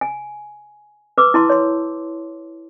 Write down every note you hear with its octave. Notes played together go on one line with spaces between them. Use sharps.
G#5
B4 D6 E6
E4 A5 C6
C#5 C6